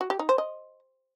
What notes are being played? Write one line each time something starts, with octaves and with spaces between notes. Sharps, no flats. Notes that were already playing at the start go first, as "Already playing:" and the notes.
F#4
G4
D#4
C5
D#5